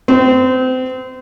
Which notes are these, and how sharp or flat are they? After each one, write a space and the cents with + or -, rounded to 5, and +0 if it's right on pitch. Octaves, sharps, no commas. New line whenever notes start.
C4 -30